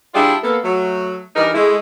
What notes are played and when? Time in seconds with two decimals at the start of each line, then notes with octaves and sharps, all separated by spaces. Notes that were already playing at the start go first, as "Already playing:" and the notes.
0.15 G3 D4 E4 F4 G#4 D5
0.43 A#3 B3 A4
0.64 F#3 A3
1.36 E3 G3 D4 D#4 A#4
1.54 G#3 A3 E4